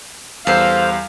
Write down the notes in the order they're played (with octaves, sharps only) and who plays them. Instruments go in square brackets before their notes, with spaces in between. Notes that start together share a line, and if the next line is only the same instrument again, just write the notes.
[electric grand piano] E2 G3 [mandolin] A4 C5 [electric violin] F5